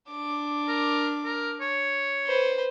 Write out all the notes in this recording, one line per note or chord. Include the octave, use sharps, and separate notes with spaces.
D4 D6
A#4
A#4
C#5
B4 C5